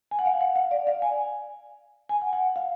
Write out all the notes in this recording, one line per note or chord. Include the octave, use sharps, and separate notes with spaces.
G#5
F#5
F5
F#5
F5
D5
F5
G#5
G#5
F#5
F#5
F5